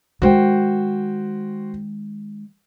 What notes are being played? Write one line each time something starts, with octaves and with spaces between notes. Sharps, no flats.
D#3 G#3 F#4 C5 G5